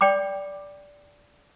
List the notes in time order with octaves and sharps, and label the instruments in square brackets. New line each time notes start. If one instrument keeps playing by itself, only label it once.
[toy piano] D5 G5 B5 D6